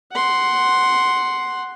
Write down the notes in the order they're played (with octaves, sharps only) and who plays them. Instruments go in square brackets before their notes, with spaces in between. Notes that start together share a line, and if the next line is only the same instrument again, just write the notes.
[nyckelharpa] F#5 C6